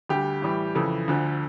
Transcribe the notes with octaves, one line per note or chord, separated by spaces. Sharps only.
D2 D3 G3 G4
A2 E3 G3
F2 C#3 E3 A4
D2 D3 F3